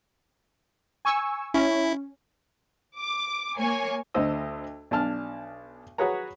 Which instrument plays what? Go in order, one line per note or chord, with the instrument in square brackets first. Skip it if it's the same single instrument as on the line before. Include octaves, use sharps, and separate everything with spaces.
[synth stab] G#5 C#6 E6
[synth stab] C#4 [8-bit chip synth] E4
[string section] D6
A#3 C#5 G#5
[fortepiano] D2 D3 C5 D#5 E6
B1 D4 G#5 A5 F6
F#4 G#4 B4 C#5 A#5